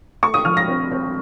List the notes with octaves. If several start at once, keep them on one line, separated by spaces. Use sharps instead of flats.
A3 C#6
D#6
F3 F6
A#6
C4
C4